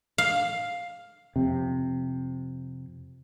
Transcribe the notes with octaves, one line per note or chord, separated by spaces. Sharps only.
F5
F2 C3